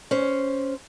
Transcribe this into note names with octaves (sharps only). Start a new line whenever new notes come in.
C#4 C5